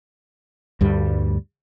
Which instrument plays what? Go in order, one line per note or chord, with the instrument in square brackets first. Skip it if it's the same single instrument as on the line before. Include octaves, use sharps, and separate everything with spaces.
[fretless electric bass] D2 G2 G3